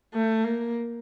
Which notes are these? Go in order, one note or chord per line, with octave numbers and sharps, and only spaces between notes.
A3
A#3